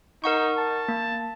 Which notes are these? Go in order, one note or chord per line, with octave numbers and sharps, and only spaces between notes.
D#4 A#4 F#5 C#6
A5
A#3